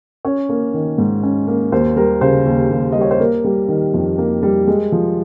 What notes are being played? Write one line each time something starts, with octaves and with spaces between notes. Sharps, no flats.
C#4 C#5
A#3
D#3
G#2
C#4
A#3
D#2 C5
G3 A#4
C#3 C5
D#2
D#2
G3 D#5
C#5
C5
A#3 A#4
G3
D#3
F2
A#3
G3
G#3
F3